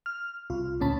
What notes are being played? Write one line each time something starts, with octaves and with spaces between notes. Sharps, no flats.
F6
C2 F4
D2 A#2 C#4 A5 B5